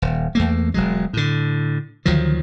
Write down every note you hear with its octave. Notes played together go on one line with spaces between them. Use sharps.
D#1
E2 A3 A#3
E1 F#3 G#3
A2 D3
D2 D#3 F3 F#3